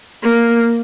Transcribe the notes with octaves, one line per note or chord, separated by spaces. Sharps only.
A#3